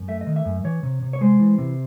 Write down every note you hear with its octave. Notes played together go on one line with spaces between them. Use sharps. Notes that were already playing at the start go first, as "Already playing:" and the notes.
Already playing: F#2
A3 E5
D#5
D#3
E5
F#2
E3 C#5
C3
C3
C#5
G#3 C5
E3
C3